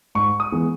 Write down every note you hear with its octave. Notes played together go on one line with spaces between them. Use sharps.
G#2 C#6
D#6
E3 G#3 B3